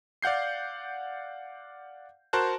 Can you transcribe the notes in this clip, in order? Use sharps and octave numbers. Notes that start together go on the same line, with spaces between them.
D5 F5 F#5 G6 C7
F#4 A#4 C5 A5 F#6